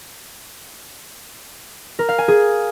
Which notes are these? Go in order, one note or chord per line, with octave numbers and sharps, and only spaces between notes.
A#4
F5
G#5
G#4